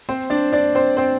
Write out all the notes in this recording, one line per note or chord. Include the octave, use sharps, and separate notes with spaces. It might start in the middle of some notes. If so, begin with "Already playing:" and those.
C4 C5
D4 D5
D4 D5
C4 C5
C4 C5